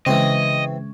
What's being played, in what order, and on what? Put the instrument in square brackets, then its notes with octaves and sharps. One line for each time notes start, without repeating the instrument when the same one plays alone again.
[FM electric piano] C#3 G#3 [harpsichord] E3 C4 [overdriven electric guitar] D#5